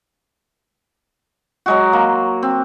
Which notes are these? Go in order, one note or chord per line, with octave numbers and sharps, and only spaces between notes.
F#3 G#3 F#4
A#3
C4